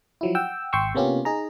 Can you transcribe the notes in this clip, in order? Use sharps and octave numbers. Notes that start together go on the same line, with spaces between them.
F3 F#3 E4
F#5 G5 E6
G#1 G5 C6 C#6 E6
C3 A#3 B3 C#4 F4 G4
D#4 G#4 A#5